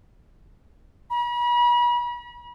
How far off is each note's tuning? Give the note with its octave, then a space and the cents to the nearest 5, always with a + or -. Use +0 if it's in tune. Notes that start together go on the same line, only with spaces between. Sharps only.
B5 -40